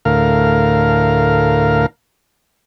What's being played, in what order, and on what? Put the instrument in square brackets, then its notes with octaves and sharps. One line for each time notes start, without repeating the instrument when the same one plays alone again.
[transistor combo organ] D2 A2 A#4 F5